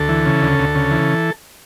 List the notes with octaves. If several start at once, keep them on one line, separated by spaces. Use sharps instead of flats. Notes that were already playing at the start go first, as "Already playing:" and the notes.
Already playing: D2 A4
E3
C#3
D2
D2
C#3
E3